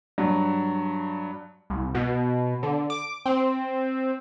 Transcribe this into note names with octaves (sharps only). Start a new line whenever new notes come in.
G2 F#3
C2
B2
D3
D6
C4